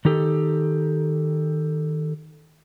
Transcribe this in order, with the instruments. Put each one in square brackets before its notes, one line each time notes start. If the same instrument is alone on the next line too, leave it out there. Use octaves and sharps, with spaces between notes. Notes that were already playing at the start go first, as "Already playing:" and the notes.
[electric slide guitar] D#3 D#4 G4 A4